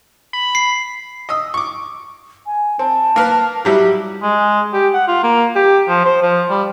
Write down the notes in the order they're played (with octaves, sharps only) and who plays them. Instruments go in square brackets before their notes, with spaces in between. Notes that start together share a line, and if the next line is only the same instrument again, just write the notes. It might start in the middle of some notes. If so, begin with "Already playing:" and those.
[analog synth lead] B5
[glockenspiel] C7
[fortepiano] D#5 D#6 E6
C#6 D6
[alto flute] G#5
[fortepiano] C4 [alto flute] A5
[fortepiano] A#3 A#4 B4
[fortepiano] F#3 G3 E4 [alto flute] G4
[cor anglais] G#3
G4
F#5
F4
A#3
G4
F3
C5
F3
G3